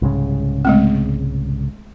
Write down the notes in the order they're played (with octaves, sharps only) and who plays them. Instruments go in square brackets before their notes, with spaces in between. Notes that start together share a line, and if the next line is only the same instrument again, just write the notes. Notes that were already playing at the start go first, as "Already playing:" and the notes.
[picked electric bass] C2 G#2 C#3
[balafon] G#3 A3 C4